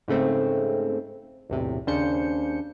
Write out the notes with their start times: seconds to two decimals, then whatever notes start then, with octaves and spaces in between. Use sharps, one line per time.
0.08 G#2 C#3 A3 C4
1.50 B1 E2 A2 C3
1.87 D#2 C#3 D4 C5 G6 C#7